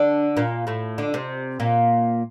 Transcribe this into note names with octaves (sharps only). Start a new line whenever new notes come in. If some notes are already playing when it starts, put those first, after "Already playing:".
Already playing: D3 D4
A#2 A#3
A2 A3
D3 D4
C3 C4
A#2 A#3